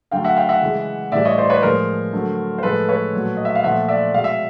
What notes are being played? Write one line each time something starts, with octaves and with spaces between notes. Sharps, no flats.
D3 F#3 A3 F5 G5
E5 F#5
F5 G5
E5 F#5
C#3 E3 G#3
A2 E3 G3 D5 E5
C#5 D#5
C5 D5
B4 C#5
A2 F3 G#3 A#4 C5
D3 F#3 A3
C5
A2 F3 G#3 A4 B4
B4 C#5
A#2 F#3 A3
D#5
E5
F5
A#2 F3 A3 E5 F#5
D5 E5
B2 G#3 F5
E5